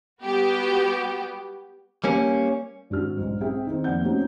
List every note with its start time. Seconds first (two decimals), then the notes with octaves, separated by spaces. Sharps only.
0.22 G3 B3 F#4 G4
2.04 G3 A#3 C#4
2.90 G#1 D4 F#4 F6
3.17 B1 G#2
3.41 C4 D#4 G#4 E5 G5
3.67 D#3 C4
3.84 F1 A#3 D5 F#5 G6
4.03 A3 C4 C#4 D#4 F#4